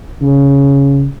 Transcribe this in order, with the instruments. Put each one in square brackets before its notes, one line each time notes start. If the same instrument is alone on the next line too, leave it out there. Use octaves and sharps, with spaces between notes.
[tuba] C#3